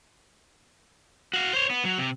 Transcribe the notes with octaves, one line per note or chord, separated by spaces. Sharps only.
F#4 F5
C5 C#5
B3
F#3
C3